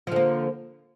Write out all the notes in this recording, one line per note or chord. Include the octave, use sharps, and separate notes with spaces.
D3 F3 A#3